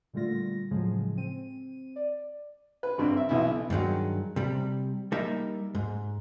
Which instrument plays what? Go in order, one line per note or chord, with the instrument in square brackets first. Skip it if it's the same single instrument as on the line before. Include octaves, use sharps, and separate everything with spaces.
[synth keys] A#2 D3 G3 A3 F4 A#6
A2 C#3 F3 F#3 G#3 G#4
C4 D#7
D5
[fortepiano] B4
G#1 G2 C4
E5
B1 E3 E4
[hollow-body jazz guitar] G2 D#3 F#3 G#3
C3 G3
G3 A#3 D#4 E5
G#2